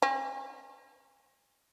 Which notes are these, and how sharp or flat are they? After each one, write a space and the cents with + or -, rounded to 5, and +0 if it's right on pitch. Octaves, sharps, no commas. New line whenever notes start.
C#4 -45